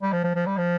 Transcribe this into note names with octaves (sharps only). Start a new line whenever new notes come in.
G3
F3
F3
F3
G3
F3